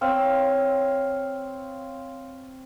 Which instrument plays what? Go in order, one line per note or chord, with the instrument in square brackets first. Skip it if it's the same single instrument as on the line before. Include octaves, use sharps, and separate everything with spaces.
[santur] C4 C#5 F5 E6